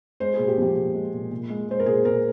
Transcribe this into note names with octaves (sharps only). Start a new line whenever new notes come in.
G#3 C5
G#4
A#2
G4
F3 G4
A#2
G#3
A#2
A#2
G#3
G#3 C5
A#4
A#2 G#4
A#2 A#4